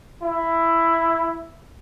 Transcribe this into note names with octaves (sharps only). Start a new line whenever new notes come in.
E4